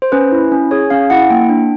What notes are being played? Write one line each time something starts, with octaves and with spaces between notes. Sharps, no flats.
C5
C#4 B4
E4
C#4
G#4 C#5
C#4 F5
E4 F#5
A#3 G5
D4